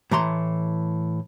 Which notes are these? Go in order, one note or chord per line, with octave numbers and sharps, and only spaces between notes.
A2 E3 A#5 C6